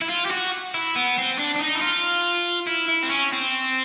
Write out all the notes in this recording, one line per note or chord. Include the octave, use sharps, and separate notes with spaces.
E4
F4
G4
F#4
E4
B3
C4
D4
D4
D#4
E4
F4
E4
E4
C4
C#4
C4